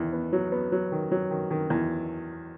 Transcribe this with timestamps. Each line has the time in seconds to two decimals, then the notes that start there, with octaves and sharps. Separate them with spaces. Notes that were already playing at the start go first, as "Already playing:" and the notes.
Already playing: E2 D#3
0.13 B3
0.33 F#3
0.52 B3
0.72 F#3
0.92 D#3
1.11 F#3
1.31 D#3
1.51 D#3
1.70 E2